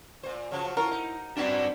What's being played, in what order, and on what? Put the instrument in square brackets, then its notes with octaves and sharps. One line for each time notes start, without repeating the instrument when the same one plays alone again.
[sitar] A#2 C5
[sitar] C#3 F3 F#3 [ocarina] C#5
[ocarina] E4 [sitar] F4 A4 C#5 [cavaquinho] A#4
[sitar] D#4
[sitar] F#2 E4 F#4 [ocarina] C4 [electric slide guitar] D4 B4 D5